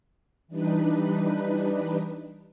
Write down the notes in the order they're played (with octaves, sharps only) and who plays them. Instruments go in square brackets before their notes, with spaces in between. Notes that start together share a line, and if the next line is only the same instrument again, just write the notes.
[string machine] E3 G3 D4 D#4 B4